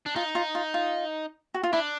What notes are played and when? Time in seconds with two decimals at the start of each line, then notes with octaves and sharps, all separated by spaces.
0.06 D4
0.15 D#4 F4
0.35 F4
0.55 F4
0.74 F4
1.54 F#4
1.63 F4
1.73 D4 E4